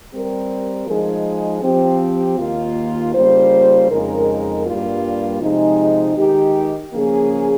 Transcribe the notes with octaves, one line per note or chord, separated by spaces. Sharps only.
G3 C4 G4 A#4
F3 G#3 D#4 G#4
F3 C4 G4
D#2 D#3 A#3 F4
C#3 G3 A#3 F4 C5
F2 C#3 G#3 D#4 A#4
G2 G3 A#3 F4
C3 F3 G#3 D#4 G#4
D#3 G#3 D#4 G4
C#3 F3 A#3 C#4 G#4